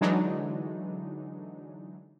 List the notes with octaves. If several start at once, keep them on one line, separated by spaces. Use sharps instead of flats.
D3 E3 F#3 G#3 D4 D#4